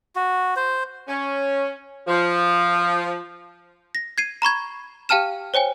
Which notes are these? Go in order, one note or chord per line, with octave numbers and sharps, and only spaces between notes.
F#4
C5
C#4
F3
A#6
G#6 C7 D#7
A#5 B5 C#6 G#6
G4 F5 G5 A5 F6 E7
C5 C#5 G5 G#5